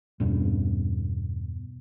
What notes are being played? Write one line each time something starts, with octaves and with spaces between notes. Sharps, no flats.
E2 G2 B2